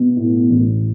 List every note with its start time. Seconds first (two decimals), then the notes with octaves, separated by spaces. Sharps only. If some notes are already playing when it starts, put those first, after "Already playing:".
Already playing: B2
0.17 A2 B3
0.50 A1